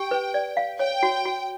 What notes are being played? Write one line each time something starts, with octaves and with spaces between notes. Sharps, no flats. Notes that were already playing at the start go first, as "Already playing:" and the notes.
Already playing: G4 G5
B4
D5
F5
C#5 G5
F#4
F#4